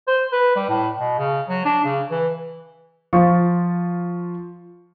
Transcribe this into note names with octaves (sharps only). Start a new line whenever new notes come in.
C5
B4
G3
A2
B2
C#3
F#3
D4
C#3
E3
F3 F4 C#6